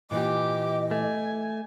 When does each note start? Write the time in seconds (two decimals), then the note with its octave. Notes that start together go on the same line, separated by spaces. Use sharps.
0.11 A#2 E3 G4 D#5 D6
0.91 A3 G#5